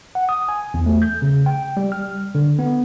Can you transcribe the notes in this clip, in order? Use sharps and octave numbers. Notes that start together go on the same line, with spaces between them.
F#5
D#6
G#5
E2
A3
G6
C#3
G5
G3
F6
D3
B3